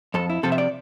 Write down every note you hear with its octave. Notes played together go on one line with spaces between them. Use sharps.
F2 A4
E4
C3 F3 A4
E5
D5